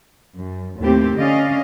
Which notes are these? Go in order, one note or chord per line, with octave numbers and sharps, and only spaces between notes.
F#2
D#2 A2 A3 C4 G4
D3 C#4 D5 D#5 F5